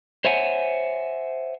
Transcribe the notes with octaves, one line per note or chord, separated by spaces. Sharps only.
C5 C#5 E5 F#5 G#5